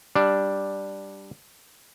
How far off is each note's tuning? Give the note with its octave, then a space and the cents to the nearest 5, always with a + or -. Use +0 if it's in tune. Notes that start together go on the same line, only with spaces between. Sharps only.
G3 +0 D4 +0 F5 +0